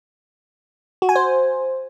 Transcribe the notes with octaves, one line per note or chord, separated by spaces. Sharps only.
F#4
G#5
C5